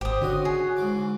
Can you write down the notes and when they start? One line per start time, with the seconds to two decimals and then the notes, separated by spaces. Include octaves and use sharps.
0.01 G#1 G4 C5 D#6
0.22 D3 C#4 F#4 D#5
0.45 G#4
0.77 G#2 E3 D6